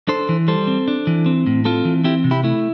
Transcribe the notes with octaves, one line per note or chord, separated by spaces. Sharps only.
D4 A4 C5
E3
G3 A4 C5
C4
D4
E3
C4
A2
C4 F4 A4
E3
C4 E4 G4
C3
E4 G4
A3 E4